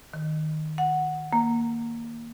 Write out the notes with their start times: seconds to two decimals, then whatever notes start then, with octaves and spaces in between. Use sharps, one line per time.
0.14 D#3
0.78 F#5
1.33 A#3